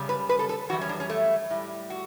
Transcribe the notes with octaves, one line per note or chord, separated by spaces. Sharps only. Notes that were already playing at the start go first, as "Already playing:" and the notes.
Already playing: F#2 C#3 G3
B4
B4
A4
A4
F#2 E3 G3 F#4
C#4
D4
C#4
A3
A2 G3
F#4